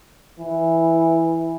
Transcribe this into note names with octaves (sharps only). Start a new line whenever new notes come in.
E3